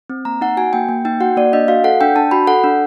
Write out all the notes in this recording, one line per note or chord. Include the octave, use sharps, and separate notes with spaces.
C4
A#3 A#5
D#4 F#5
F#4 G#5
A#3 G5
A#3
D#4 G5
F#4 F#5
A#3 D5
D4 D#5
F#4 F5
A4 F#5
D4 G5
D4 A5
F#4 B5
A4 F#5
D4